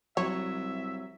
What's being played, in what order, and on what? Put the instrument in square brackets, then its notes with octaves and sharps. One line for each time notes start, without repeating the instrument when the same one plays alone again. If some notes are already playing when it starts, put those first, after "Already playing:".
[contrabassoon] C2 [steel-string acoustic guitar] F#3 [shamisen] C#5 [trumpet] E5